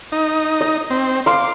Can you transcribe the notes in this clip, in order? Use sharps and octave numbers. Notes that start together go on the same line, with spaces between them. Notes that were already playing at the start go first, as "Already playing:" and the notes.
D#4
D#5
C4
F5 C6 D6